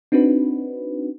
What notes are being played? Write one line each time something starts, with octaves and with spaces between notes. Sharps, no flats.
C4 D4 D#4 F#4 B4